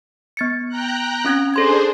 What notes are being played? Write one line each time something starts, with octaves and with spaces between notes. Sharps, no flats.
B3 A6 C#7
G5 A#5 F#6
C4 C#4 G#6
D4 G#4 A4 C5 C6 G#6